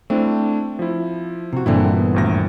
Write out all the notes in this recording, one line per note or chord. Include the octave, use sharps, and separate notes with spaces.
A3 C4 D4 E4
F3 E4
C3 F#4
G2 A#2 D3 E3 C4 E4
B3
G#1 D2 A#6